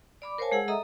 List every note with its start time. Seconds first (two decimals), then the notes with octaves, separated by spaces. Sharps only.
0.22 D5 B5 D6
0.38 A#4 C5 C#5 F5 G#5 A5
0.52 G#3 G#4 F#5 E6
0.68 A4 D#5 E5 A#5 D#6